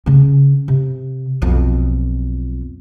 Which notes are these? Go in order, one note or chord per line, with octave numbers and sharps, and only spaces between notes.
C#3 C#4
C3
B1 F2